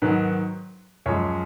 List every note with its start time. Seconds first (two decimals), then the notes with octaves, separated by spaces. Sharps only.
0.02 G#2 D#3 F#3 B4
1.06 F#2 F3 G#3 C#5